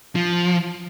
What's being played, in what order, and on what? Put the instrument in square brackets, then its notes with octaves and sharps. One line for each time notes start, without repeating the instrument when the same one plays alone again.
[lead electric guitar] F3